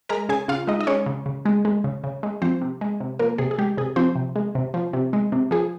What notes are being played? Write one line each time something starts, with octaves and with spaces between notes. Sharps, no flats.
G#3 A#4 A#5
C#3 G#4 G#5
C#3 F4 F5
G#3 D#4 D#5
D#5
G#3 C#4 C#5
C#3
C#3
G#3
G#3
C#3
C#3
G#3
F3 C4 C5
C3
G#3
C3
F3 A#3 A#4
C3 G#4
G#4
G#3 G4
C3 G#4
F3 C4 C5
C3
G#3
C3
F3
C3
G#3
C3
F3 G#4